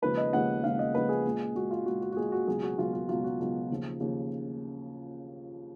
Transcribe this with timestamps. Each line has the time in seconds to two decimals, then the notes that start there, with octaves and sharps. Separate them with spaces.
0.02 D#2 C#3 F3 G#3 B4
0.17 D#5
0.33 D#2 C#3 F3 G#3 F#5
0.64 D#2 C#3 F3 G#3 F5
0.79 D#5
0.94 D#2 C#3 F3 G#3 B4
1.09 G#4
1.25 A#2 G#3
1.55 A#2 G#3 F#4
1.71 F4
1.86 A#2 G#3 F#4
2.02 F#4
2.12 F#4
2.17 A#2 G#3 G#4
2.32 F#4
2.47 C#2 B2 F#3 G#4
2.63 F#4
2.78 C#2 B2 F#3 F4
2.94 F4
3.09 C#2 B2 F#3 F4
3.24 F#4
3.40 C#2 B2 F#3
3.70 D#2 C#3 F3
4.00 D#2 C#3 F3